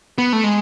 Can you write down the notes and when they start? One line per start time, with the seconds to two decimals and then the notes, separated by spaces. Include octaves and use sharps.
0.18 B3
0.33 A3
0.44 G#3